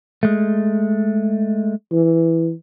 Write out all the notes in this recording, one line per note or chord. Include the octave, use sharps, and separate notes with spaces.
G#3 A3
E3